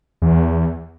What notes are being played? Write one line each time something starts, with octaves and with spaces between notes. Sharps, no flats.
E2